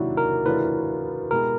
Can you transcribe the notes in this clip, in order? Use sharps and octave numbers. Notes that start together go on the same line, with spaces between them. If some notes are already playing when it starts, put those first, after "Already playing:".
Already playing: C3 D#3 F#3 A#3 D4 E4 F#4
A#4
A2 E3 A3 D4 F4 B4
B2 G#3 B3 E4 G4 A#4